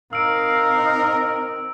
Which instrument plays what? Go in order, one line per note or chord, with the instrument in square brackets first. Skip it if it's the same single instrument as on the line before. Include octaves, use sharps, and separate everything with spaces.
[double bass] C4 D#4 [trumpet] A#4 [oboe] F5 [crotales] E6 D7